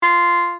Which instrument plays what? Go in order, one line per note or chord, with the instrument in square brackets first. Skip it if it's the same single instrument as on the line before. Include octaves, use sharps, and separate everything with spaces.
[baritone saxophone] F4